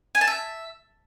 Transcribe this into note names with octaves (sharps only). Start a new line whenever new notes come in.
G#5
A5
E5